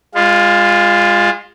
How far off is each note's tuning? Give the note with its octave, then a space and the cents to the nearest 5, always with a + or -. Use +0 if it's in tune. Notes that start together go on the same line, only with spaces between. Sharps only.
G#3 -30 F4 +5